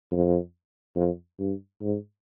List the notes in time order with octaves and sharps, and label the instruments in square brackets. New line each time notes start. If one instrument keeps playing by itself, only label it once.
[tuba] F2
F2
G2
G#2